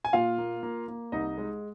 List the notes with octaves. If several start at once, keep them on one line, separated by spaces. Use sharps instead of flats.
G#5
A#2 F4 F5
A#3
A#3
A#3
C2 D#4 D#5
G#3